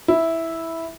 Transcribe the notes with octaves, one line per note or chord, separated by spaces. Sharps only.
E4